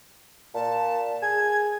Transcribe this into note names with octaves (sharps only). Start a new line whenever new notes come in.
A#2 A5
G#4 G#6